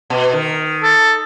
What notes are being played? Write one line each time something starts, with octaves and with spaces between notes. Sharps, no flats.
B2
D#3
A4